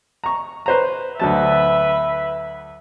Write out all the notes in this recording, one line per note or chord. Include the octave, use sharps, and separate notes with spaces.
A#5 C#6
B4 C5 A#5
D2 F#3 B4 E5 A5